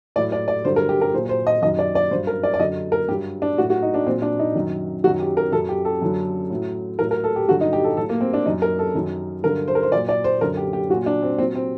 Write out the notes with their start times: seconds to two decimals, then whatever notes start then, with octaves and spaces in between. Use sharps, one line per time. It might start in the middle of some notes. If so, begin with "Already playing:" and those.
0.16 A2 F#3 D5
0.32 D5
0.48 D5
0.65 G2 D3 F#3 C5
0.76 A#4
0.89 G4
1.01 A#4
1.14 A#2 F#3 C5
1.29 C5
1.47 D#5
1.62 F#2 D#3 F#3 D#5
1.79 D5
1.95 D5
2.11 G2 F#3 C5
2.27 A#4
2.43 D5
2.54 D5
2.59 F#2 D3 F#3 D#5
2.92 A#4
3.08 G2 G4
3.12 F#3
3.42 D4
3.58 A2 F#3 F#4
3.70 F#4
3.83 D#4
3.94 D4
4.07 A#2 F#3 C4
4.22 D4
4.39 D#4
4.56 F#2 D#3 F#3
5.04 F#2 D#3 F#3 F#4
5.20 G4
5.37 A#4
5.52 F#2 F#3 A4
5.69 G4
5.85 A4
6.02 F#2 D3 F#3
6.50 A2 F#3
6.99 A2 F#3 A#4
7.11 A#4
7.24 A4
7.36 G4
7.48 G2 D3 F#3 F#4
7.61 D#4
7.73 G4
7.84 A4
7.97 A2 F#3 A4
8.09 A#3
8.21 C4
8.33 D4
8.46 F#2 F#3 D#4
8.62 A#4
8.79 A4
8.95 F#2 D#3 F#3
9.43 G2 D3 F#3 A#4
9.68 C5
9.75 A#4
9.83 C5
9.92 A#2 F#3 D5
10.09 D5
10.24 C5
10.41 F#2 D3 F#3 A#4
10.57 G4
10.73 G4
10.89 F#3 F#4
10.93 A#2
11.06 D4
11.22 C4
11.38 A#2 C4
11.42 F#3
11.55 C4